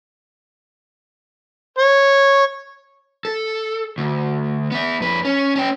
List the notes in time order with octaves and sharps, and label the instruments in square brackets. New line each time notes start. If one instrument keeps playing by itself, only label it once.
[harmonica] C#5
[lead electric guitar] A4
D2
B3 E5
F2 B4
C#4
C#4 G5